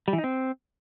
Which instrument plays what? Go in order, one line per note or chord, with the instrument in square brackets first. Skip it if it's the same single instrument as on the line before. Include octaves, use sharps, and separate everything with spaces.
[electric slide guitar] G3
E3
D#4
C4